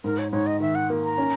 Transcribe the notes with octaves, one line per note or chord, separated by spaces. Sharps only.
G#2 A#4
C#5
G#2 C#5
D#5
D#3 E5
F#5
A#3
A#5
C#4